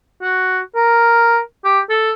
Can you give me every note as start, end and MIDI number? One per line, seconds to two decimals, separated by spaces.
0.22 0.60 66
0.75 1.39 70
1.65 1.80 67
1.90 2.11 69